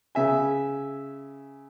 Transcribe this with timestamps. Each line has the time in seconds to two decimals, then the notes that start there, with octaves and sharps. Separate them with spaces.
0.15 C#3 E5 G#5